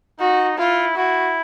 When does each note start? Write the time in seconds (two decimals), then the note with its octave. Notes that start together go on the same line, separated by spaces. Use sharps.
0.20 D#4 F#4
0.58 E4 F4
0.96 E4 F#4